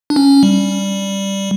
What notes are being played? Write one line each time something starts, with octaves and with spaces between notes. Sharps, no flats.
D4
C#4
G3